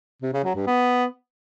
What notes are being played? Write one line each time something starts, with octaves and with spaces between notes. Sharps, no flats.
C3
C#3
F#3
G2
B3